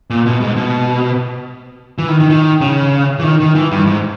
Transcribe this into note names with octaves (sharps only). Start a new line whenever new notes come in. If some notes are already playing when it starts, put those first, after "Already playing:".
A#2
B2
G#2
B2
E3
D#3
D#3
D#3
C#3
E3
D#3
D#3
E3
G2
G#2